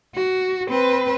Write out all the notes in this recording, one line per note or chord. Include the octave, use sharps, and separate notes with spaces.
F#4
C4 B4